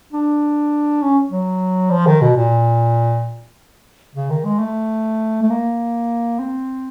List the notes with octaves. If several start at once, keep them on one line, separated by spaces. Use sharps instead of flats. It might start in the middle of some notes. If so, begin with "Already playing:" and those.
D4
C#4
F#3
F3
D#3
B2
A#2
C#3
D#3
G#3
A3
A3
A#3
C4